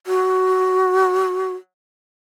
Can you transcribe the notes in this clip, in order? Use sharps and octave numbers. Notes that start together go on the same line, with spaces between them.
F#4